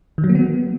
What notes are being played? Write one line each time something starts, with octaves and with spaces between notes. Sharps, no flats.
D#3
F#3
A#3
B3